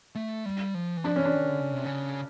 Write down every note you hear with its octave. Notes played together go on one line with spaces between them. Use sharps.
A3
G3
F3
E3
F3 D4
E3 C#4
D4
D#3
D3
C#3
C3
C#3